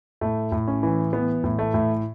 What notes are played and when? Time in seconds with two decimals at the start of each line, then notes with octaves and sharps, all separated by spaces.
0.21 A2 A3
0.52 A2
0.68 C#4
0.83 E3
1.13 E3 B3
1.44 A2
1.59 A3
1.74 A2